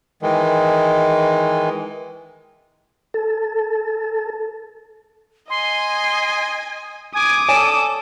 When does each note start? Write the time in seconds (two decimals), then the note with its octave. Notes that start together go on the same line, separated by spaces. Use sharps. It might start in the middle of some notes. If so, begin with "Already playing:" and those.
0.22 D#3 E3 G#3
3.14 A4
5.50 D#5 G#5 C6
7.14 G#5 D6 D#6
7.49 A4 C#5 D5 G#5 E7